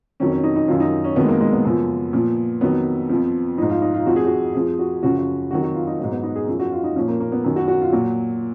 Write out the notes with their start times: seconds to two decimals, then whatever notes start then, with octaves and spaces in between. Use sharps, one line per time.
0.20 F2 D#3 F#3 C#4
0.32 C#4
0.44 D#4
0.56 D#4
0.68 F#2 D#3 F#3 F4
0.80 D#4
1.04 C#4
1.16 F2 D#3 F#3 B3
1.24 G#3
1.28 A#3
1.40 G#3
1.53 B3
1.65 F#2 C#3 F3
2.13 A#2 F3
2.61 F2 D#3 F#3 B3
3.09 F2 F3
3.58 F3 D#4
3.62 G#2
3.70 F4
3.82 D#4
3.94 F4
4.06 F2 F3 F#4
4.16 G#4
4.26 F#4
4.54 F2 F3 G#4
4.79 F#4
5.03 F#2 C#3 F3 F#4
5.19 F#4
5.51 F2 D#3 F#3 F#4
5.63 F#4
5.75 F4
5.87 D#4
5.99 G#2 F#3
6.11 B3
6.23 D#4
6.36 G#4
6.48 F#2 F3
6.59 F#4
6.72 F4
6.84 D#4
6.96 A#2 F3 C#4
7.08 A#3
7.20 A#3
7.32 B3
7.44 F#2 D#3 F#3
7.56 F#4
7.68 F#4
7.82 F4
7.92 A#2 F#3 F#4